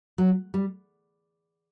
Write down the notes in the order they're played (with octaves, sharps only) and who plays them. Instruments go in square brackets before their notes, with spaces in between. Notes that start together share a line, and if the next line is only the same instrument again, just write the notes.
[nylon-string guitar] F#3
G3